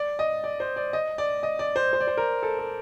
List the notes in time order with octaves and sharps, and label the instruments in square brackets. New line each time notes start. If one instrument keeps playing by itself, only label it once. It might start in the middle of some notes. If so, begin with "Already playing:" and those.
Already playing: [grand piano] D5
D#5
D5
C5
D5
D#5
D5
D#5
D5
C5
C5
D5
C5
A#4
A4
A4